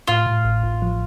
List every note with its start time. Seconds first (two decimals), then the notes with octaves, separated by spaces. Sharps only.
0.08 A2 F4
0.26 A2
0.45 A1
0.63 A1
0.82 F3